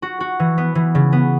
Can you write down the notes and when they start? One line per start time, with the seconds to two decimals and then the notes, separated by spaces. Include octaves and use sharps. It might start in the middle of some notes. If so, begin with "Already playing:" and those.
0.02 F#4
0.20 F#4
0.40 E3
0.58 B3
0.75 E3
0.95 C#3
1.13 B3